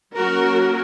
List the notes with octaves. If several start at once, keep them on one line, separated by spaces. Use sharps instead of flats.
F#3 A#3 C#4 F#4 A#4